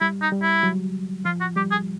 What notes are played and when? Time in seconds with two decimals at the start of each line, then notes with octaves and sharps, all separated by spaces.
0.01 G3 E4
0.22 D#4
0.32 G3
0.42 E4
0.63 F#3
1.25 F3 F4
1.41 F#4
1.56 G3 G4
1.72 G#4